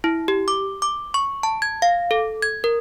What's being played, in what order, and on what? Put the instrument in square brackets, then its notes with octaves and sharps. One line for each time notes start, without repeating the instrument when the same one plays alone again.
[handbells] E4
G4
D6
D6
C#6
A5
G#6
F5
A4
G#6
A#4